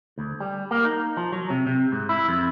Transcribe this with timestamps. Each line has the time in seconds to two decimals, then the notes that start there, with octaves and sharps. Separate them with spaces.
0.18 D2
0.40 G3
0.71 A#3
0.85 D#4
1.17 F3
1.32 F#3
1.50 C3
1.67 C3
1.92 G#2
2.09 E4
2.28 F2